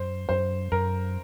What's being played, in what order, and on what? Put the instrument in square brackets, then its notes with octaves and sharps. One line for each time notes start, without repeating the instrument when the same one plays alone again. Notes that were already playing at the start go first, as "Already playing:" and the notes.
Already playing: [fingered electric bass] F#2 [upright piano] C5
[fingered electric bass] F#2 [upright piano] C5
[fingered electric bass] F#2 [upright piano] A#4